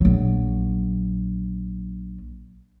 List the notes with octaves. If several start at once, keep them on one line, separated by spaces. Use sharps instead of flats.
A#1 F#3